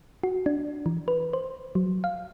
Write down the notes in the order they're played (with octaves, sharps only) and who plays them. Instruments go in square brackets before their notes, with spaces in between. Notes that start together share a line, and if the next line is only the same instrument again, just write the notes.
[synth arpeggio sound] F#4
D4
E3
B4
C5
F#3
F5